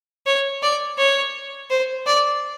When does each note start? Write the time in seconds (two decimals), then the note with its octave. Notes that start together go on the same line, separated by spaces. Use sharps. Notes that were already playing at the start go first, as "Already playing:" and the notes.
0.26 C#5
0.63 D5
0.98 C#5
1.70 C5
2.06 D5